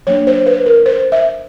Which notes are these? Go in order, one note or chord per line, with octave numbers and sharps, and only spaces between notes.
F#3 A#3 D4 C#5
C5
B4
A#4
C5
E5